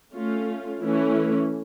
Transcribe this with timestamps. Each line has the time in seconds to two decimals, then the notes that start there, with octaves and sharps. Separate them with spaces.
0.14 A3 C#4 F4
0.81 E3 A3 C#4 E4